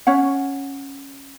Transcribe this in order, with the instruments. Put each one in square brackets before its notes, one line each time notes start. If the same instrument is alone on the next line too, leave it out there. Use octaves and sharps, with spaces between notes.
[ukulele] C#4 C#5 F#5